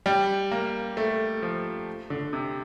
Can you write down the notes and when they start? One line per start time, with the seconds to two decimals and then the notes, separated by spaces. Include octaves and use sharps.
0.06 G3
0.51 A#3
0.97 A3
1.42 F3
2.10 D3
2.33 C3